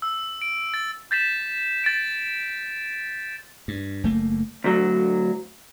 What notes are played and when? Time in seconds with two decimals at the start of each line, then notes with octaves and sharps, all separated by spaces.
0.02 E6
0.42 D7
0.74 A6
1.11 G6 A6 B6 E7
1.84 A6 D7
3.68 G2
4.04 F#1 A3 A#3
4.64 D2 F#3